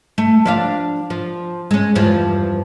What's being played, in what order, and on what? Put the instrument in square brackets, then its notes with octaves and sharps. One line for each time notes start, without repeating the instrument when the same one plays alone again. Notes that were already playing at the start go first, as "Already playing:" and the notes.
[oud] A3
F3 D4 F5
F3
G#3 C#4
E2 G2 F3